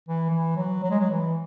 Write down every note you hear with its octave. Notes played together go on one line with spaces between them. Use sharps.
E3
E3
F#3
F#3
G#3
F#3
E3